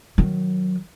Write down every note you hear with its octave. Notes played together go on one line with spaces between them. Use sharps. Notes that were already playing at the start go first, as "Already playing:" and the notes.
D#3 F#3